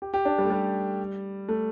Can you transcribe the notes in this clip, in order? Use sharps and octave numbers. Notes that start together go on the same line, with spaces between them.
G4
G4
D4
G3
A3
G3
A3